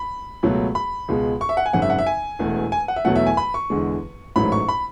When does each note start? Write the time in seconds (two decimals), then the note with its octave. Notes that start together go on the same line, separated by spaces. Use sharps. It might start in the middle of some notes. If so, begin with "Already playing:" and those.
Already playing: B5
0.43 C#2 B2 F#3 A3
0.75 B5
1.08 C#2 B2 G#3
1.41 C#6
1.49 E5
1.57 F#5
1.66 G#5
1.73 G#1 F#2 C#3 F#5
1.82 E5
1.90 F#5
1.99 E5
2.07 G#5
2.39 E1 E2 B2 A3
2.72 G#5
2.88 F#5
2.96 E5
3.05 E2 B2 F#3 A3 F#5
3.16 E5
3.27 G#5
3.37 B5
3.54 C#6
3.70 E2 D3 G#3
4.36 A1 G#2 F#3 A3 B5
4.52 C#6
4.69 B5